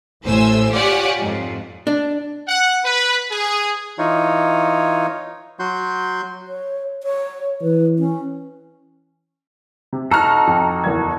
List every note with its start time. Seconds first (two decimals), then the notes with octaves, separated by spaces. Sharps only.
0.24 A1 A2 C5 G#5 E6
0.72 F4 G4 C#5 D5 F#5 G#5
1.19 F2 G#2
1.87 D4
2.46 F#5
2.83 B4
3.30 G#4
3.99 E3 D#4 F4 C#5
5.60 F#3 F#4 C6 G6
6.48 C#5
7.03 C#5
7.62 E3 B4
7.99 C#4
9.93 C3
10.11 D#4 F#4 A4 A#5 F6
10.47 F2
10.84 F#1 E2 G#6